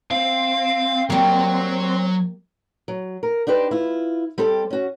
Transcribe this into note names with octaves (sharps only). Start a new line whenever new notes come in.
C4 F5
F#3 G3 A#3
F#3
A#4
D4 D#4 G4 B4 C5
E4 F4
G3 C4 G4 A4
C#4 F#4